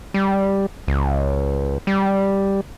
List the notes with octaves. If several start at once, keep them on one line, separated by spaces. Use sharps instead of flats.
G3
C#2
G3